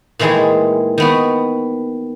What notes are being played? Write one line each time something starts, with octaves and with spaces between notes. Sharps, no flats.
A#2 D#3 E3 G#3 A3 G#4
D#3 B3 F#4